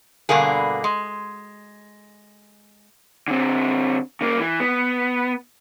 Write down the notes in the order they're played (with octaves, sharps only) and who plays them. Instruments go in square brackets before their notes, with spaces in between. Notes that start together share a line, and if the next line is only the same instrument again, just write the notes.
[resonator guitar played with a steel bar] G2 B2 D3 A#3 G#4
G#3
[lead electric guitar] D3 C4
C#3 A#3
E3
B3